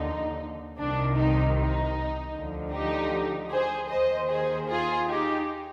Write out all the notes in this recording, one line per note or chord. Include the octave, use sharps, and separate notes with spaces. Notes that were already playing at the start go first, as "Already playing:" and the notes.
Already playing: D#2 D3 F3 D#4
C2 C3 D#3 D4
D#4
D#4
D2 D3 F3
D#4 G4
G#4 C5
D#2 D#3 C5 D#5
G#4 C5
F4 G#4
D#4 G4